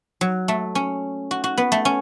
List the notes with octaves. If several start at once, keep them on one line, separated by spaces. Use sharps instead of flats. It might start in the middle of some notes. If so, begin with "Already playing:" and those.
F#3
A3
C#4
F#4
F#4
B3
A3
C#4